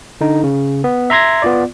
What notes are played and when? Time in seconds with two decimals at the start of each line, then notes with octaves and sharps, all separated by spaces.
0.21 D3 D#4
0.44 C#3
0.84 B3
1.10 E5 A#5 C6 G#6 A#6
1.42 B3 F4 D5